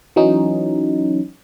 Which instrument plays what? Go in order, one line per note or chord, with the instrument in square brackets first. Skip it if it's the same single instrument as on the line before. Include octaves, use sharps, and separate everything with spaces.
[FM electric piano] E3 F#3 C#4 D#4